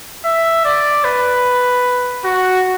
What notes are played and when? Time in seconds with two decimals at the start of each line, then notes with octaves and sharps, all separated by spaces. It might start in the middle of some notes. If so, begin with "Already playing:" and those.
0.25 E5
0.65 D5
1.04 B4
2.25 F#4